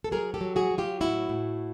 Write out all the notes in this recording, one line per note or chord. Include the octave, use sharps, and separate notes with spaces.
A4
F#3 G#4 A#4
G4 A4
F#3
F#4 G#4
F#3
F4 G4
A2 E4 F#4
A2